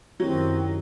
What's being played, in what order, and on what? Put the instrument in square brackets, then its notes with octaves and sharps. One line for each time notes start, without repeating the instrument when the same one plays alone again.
[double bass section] F#2 D#3 [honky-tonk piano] F#3 [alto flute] C4 [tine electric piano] E4 G4